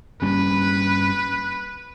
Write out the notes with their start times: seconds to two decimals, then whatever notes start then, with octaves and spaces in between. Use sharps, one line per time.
0.22 G2 G3 A#3 C#4 B4